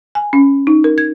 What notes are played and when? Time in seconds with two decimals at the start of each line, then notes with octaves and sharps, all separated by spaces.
0.15 G#5
0.33 C#4
0.67 D#4
0.84 A#4
0.98 G#6